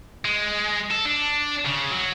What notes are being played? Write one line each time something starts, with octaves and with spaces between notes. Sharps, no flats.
G#3
A4
D4
C#3
F#3